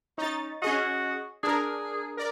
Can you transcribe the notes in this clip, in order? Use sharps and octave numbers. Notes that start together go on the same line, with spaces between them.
C#4 D#4 A6
C#4 F#4 G#4 D#5
D4 G#4 A#4
A#4 D5